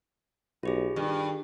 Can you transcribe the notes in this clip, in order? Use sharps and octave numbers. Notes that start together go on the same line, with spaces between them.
B1 F4 G4 G#4
G2 D#3